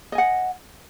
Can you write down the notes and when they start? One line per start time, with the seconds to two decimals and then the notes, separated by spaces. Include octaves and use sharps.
0.12 D#5
0.15 G#5
0.18 F#5